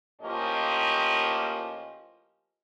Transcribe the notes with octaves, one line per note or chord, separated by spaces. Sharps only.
A2 F3 A#3 C#4 G4 D#5